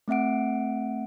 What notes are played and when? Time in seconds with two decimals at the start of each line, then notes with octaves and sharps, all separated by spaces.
0.08 A3 C4 E5 F#5 D7